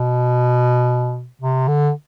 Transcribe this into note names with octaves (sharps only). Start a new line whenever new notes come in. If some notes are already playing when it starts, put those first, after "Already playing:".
Already playing: B2
C3
D3